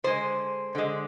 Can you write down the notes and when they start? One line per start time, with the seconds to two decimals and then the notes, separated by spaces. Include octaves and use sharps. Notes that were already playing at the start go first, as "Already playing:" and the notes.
0.04 D3 G#3 C5
0.75 D3 G#3